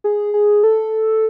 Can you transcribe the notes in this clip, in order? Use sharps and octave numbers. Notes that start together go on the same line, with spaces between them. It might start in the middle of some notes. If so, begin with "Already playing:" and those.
G#4
G#4
A4